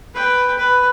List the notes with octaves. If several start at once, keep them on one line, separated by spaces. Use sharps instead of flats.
B4 G5
B4